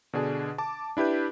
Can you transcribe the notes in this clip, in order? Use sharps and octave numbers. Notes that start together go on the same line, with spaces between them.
B2 D3 D4 G#4
A5 D6
D4 E4 G4 B4 G6